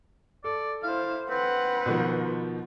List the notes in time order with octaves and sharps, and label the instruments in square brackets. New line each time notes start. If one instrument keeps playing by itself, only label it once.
[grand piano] A4 [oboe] D5
[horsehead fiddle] E4 C5 [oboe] F5
[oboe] C4 [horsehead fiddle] B4 F#5
[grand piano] B2 D#3 F3